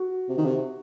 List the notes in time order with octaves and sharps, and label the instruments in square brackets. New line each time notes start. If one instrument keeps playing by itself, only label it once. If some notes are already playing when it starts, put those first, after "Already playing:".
Already playing: [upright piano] F#4
[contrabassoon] C3
D#3
C3